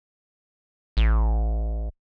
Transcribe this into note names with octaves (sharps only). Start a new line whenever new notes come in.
A1